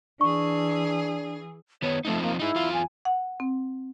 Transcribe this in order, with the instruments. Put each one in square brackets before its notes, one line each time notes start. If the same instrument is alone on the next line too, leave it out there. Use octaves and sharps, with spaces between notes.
[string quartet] E3 G#4 [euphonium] D4 [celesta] C#6
[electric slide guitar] D#3 B3 D#4 [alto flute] C#5
[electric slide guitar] F3 C4 D#4 [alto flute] A3
[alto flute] A#3
[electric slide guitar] D#4 G#4 [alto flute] E4
[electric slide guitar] E2 F4 F5
[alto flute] G#5
[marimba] F#5
C4